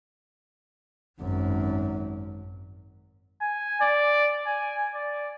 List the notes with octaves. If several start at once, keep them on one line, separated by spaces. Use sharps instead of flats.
G#1 F#2
G#5
D5
G#5
D5